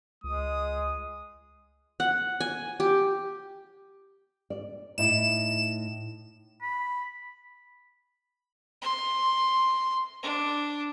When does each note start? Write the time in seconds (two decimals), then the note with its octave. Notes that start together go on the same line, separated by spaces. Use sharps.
0.24 C#2 G#3 D#6
2.00 F#5
2.41 G#5
2.80 G4
4.50 D5
4.98 A2 D#4 E4 E7
6.62 B5
8.82 C6
10.23 D4